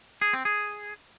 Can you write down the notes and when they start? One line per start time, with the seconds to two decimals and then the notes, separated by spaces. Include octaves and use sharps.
0.22 G#4
0.33 C4
0.45 G#4